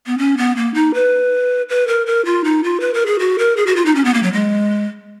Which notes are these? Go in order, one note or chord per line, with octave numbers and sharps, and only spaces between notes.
B3
C#4
B3
A#3
D#4
B4
B4
A#4
A#4
F4
D#4
F4
B4
A#4
G#4
F#4
A#4
G#4
F#4
F4
D#4
C#4
B3
A#3
F#3
G#3